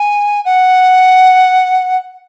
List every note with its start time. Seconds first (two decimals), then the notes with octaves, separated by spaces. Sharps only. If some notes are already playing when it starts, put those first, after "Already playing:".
Already playing: G#5
0.45 F#5